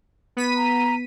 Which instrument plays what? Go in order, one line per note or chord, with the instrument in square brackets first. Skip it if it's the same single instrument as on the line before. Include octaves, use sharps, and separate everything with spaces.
[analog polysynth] B3 B6 D#7
[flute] A#5